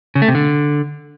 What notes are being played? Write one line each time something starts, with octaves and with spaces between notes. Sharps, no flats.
C#3
A3
C3
D3